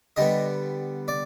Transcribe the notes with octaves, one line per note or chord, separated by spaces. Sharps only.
D3 G3 B3 D#5
D5